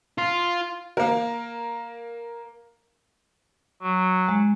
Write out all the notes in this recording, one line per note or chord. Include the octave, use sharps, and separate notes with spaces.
F4
A#3 A#4
F#3
G#3